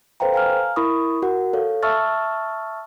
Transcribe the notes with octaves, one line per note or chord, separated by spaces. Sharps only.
A4 B4 C5 F5 G5 A#5
F5 G#5 A#5 F6
E4 A#4 B5 C#6 D#6
F#4 A#4 F#5
A4 C#5 F5
E5 A5 C#6 E6 F6 A6